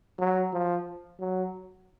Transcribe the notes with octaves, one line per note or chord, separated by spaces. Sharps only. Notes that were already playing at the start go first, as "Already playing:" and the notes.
F#3
F3
F#3